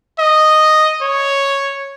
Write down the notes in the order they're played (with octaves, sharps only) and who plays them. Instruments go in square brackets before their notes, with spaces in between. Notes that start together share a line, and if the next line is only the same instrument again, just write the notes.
[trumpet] D#5
C#5